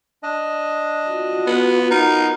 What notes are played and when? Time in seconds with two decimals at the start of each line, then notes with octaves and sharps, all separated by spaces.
0.23 D4 D#5
1.08 F4 F#4
1.47 B3
1.91 B3 D#4 A#4